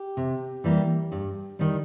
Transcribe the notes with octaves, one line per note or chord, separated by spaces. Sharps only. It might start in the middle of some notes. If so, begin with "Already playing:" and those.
Already playing: G4
C3
E3 G3 A#3
G2
D#3 G3